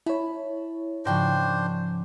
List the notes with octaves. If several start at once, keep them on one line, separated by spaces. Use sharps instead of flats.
E4 C#5 A5 B5
G#2 C#3 F3 D4 A#4 C5 G5 C#6